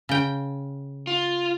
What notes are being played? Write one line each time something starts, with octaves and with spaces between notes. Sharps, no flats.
C#3 G5
F4